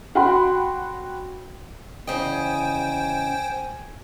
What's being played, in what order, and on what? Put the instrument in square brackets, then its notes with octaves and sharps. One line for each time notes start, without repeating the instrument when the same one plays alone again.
[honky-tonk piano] F#4 F#5 G5 B5 C6
[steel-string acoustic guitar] E2 C#3 D#5 [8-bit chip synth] C5 G5
[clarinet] G#5